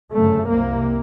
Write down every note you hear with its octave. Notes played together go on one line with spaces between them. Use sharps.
G1 F#2 C#3 A3
C2 C3 A#3